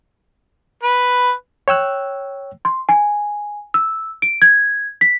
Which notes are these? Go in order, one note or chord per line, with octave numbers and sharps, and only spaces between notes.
B4
C#5 G5 E6 F#6
C6
G#5
E6
D7
G#6
B6